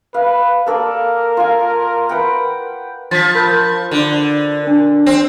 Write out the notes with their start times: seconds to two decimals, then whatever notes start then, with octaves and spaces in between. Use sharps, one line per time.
0.14 B4 F5
0.66 A#3 A4 A#4 D5
1.37 F4 G#5
2.09 B4 F#5 G5
3.11 F3 A6 B6
3.35 A#4 B5 G6
3.91 D3
4.63 D4 A#4
5.06 C4